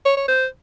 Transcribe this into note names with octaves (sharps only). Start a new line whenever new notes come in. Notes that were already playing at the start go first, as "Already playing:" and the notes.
C#5
C#5
C5